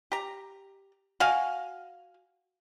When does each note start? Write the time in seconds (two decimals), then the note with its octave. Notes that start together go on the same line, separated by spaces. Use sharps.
0.12 G4 A#5
1.20 F#4 F5 G#5